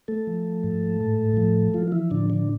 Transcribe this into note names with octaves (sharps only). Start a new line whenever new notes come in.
A3 A4
F3
G#2
A2
F3
F3 F4
F4
E3 E4
A2 D3 D4
D3 D4